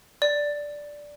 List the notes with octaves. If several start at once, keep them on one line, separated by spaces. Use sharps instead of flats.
D5